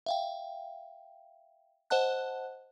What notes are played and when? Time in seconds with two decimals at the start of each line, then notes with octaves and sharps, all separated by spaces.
0.06 E5 F5 G5
1.90 C5 D#5 F#5 A5 F#6